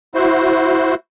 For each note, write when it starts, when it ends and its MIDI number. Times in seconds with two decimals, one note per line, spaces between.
0.15 0.95 64
0.15 0.95 66
0.15 0.95 72